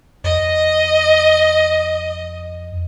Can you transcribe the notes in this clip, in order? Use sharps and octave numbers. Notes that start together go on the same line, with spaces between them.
F2 D#5